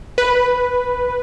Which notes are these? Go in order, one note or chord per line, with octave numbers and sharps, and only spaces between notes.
B4